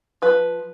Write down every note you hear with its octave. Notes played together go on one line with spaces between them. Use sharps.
F3 B4